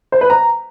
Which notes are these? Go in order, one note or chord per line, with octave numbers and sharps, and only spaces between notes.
C5
B4
A#5